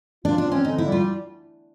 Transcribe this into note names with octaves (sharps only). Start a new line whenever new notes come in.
D4 F4
D4
C4
C#4
D3 D#4
E4
G3
F4